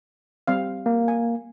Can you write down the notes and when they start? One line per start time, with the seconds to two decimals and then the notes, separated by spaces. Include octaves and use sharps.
0.47 G3 C4 F5
0.86 A#3
1.08 G#5